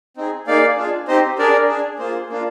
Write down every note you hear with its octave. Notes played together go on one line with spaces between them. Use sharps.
C4 D#4 G#4
A#3 D#4 G#4 D5 F5
D4 F4 G#4
C4 D#4 G4 C5 D#5
D4 G#4 A#4 D5
D4 G#4
A#3 F4 G#4 C5
A#3 D4 F4